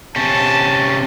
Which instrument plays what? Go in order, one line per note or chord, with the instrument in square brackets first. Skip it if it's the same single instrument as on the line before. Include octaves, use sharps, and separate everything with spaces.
[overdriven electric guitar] C3 C#4 [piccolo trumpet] A5